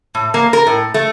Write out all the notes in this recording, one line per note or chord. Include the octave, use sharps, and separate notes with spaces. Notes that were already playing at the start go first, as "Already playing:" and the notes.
A2
A#3
A#4
A2
A3